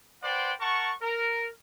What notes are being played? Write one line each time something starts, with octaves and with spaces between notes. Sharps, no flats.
B4 C5 D5 F#5 G5 C6
A#4 F#5 A5 C#6
A#4